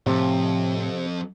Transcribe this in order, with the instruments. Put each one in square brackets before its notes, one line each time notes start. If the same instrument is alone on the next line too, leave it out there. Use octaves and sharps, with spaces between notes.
[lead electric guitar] F2 [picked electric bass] A2 F3 [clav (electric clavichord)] C3